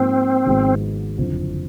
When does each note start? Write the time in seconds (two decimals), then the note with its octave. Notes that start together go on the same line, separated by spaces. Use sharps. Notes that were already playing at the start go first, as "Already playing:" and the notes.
Already playing: G#2 F3 A#3 C4
0.46 G#1 G#2 F3 G#3 B3
1.18 F#1 F2 D3 F3